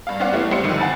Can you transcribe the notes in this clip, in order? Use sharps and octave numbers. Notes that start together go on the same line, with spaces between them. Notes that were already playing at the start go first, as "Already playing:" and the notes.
G2 F5
B3 C#4 C5 D5 F5 F#5
E3 G3 A3 B3 C4
C#2 G3 C5 C#7
F2 D3 D#3
F#5 G#5 A5 B5 A6